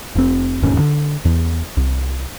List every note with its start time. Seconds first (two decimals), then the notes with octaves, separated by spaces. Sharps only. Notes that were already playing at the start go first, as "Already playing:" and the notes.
0.16 F1 C4
0.63 E1 D#2 G#2 C#4
0.79 D3
1.25 E2
1.77 C2